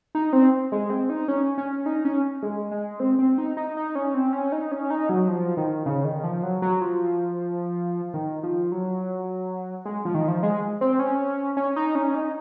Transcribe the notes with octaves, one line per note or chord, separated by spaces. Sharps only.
D#4
C4
G#3
C4
D#4
C#4
C#4
D#4
C#4
G#3
G#3
C4
C4
D#4
D#4
D#4
C#4
C4
C#4
D#4
C#4
D#4
F#3
F3
D#3
C#3
D#3
F3
F#3
F#3
F3
D#3
F3
F#3
G#3
F3
D#3
F3
G#3
C4
C#4
C#4
D#4
C#4
D#4